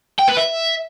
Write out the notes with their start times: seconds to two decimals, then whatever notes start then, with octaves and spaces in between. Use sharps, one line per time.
0.19 G5
0.28 B4
0.37 E5